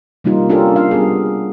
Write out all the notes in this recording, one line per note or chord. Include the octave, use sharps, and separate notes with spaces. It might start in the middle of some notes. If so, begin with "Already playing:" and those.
C3 G3 A#3 D#4 F4
C#4 D4 F4 G4 A4 A#4
D4 F5
G3 B3 G#4